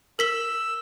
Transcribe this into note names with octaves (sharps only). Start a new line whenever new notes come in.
A#4 E6 B6 G7